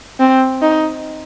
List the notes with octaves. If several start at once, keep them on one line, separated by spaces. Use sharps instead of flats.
C4
D#4